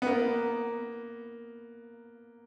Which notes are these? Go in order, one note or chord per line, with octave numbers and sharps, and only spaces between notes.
B3
A#3